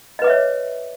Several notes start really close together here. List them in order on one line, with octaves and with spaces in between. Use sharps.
D#5 B4 D6 E5 C#5